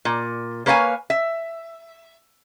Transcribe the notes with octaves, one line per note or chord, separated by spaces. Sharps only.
A#2
A#3 B4 C#5 F5 G5 G#5
E5